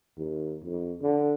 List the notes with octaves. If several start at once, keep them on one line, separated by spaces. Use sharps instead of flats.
D#2
F2
D3